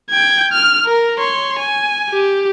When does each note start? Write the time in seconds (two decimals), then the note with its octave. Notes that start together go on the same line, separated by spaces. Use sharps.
0.10 G5 G#6
0.52 F6
0.86 A#4
1.18 C#5 C6
1.60 G#5
2.12 G4